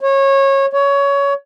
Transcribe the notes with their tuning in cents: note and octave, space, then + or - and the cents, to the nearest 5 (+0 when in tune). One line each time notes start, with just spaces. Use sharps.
C#5 -20
C#5 +20